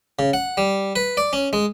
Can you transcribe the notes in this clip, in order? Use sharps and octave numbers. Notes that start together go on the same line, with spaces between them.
C#3
F#5
G3
B4
D5
C#4
G#3